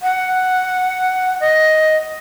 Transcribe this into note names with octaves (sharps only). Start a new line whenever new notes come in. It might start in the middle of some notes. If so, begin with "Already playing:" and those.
F#5
D#5